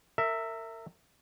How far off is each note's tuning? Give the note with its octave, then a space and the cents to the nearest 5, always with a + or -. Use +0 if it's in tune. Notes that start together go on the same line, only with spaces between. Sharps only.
A#4 -35 E5 +0